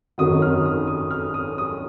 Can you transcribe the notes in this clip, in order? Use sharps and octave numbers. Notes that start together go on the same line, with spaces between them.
G#1 F#2 D#3 F#3 D#6
F6
D#6
D#6
F6
D#6
D#6